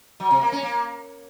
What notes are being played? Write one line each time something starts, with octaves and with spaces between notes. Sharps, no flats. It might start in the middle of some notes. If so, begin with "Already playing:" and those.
F#3
C3
A#3
C#4
A#3